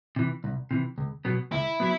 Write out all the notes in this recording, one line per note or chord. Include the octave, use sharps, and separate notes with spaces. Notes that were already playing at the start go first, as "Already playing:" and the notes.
C3 E3
C2
C3 E3
C#2
B2 F#3 B3
C#2 E4
F#3 B3